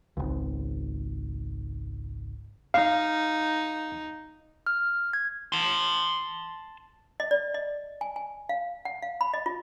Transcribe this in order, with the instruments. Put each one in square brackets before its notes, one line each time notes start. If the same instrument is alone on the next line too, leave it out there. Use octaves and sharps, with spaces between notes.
[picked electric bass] G#1 C#2
[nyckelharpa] D#4 [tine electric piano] F5
[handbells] F6
G#6
[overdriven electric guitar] A5 C6
[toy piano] D#5
D5
D#5
G#5
G#5
F5
F#5
F5
B5
D#5
F4